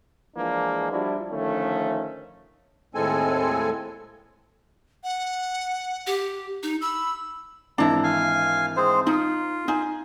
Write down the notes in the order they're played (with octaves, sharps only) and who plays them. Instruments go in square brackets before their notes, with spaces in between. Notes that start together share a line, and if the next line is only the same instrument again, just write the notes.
[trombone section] E3 F3 G#3 A#3 D4
F3 G3 D4 E4 F#4
D3 D#3 F3 A3 C#4
[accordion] D#2 A2 G#3 C4 A4 G#5
[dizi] F#5
[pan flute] G4
D#4
[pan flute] B5 [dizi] E6
[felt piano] G#1 E3 A5 [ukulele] D4 E4 [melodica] A#5
[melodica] F5 G#5
G#3 C4 C5
[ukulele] D#4 [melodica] F4
[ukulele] D#4 [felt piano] G#5